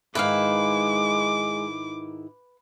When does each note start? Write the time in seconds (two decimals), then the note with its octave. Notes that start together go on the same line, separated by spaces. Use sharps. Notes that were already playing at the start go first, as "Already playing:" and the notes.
0.15 G#2 D#3 G#3 E4 B4 F5 D6